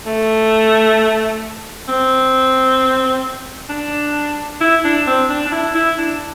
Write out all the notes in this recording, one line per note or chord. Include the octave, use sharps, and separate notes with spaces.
A3
C4
D4
E4
D4
C4
D4
D4
E4
E4
D4